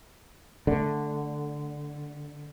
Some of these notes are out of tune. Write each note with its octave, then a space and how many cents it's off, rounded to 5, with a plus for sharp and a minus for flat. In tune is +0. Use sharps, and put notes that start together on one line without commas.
D3 +0 A3 -10